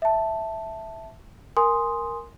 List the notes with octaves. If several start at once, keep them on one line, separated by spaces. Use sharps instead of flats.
E5 A5
A#4 G#5 C6 D#6